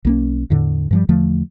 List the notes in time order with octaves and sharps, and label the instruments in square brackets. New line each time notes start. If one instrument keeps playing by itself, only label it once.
[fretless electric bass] B1 A#3 C#4
E2 A2 D3
G2 F3 G3
E2 D3 F3 A3